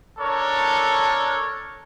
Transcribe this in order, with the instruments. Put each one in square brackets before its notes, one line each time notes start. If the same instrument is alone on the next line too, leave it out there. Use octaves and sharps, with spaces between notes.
[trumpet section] D4 A4 A#4 C#5